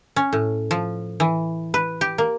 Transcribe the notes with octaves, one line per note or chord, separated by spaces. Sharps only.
C#4
A2
F3
E3
B4
G4
A#3